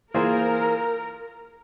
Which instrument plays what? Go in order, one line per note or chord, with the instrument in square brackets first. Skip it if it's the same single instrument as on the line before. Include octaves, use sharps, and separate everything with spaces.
[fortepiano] E3 A#3 F4 G#4 C5 [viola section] A#4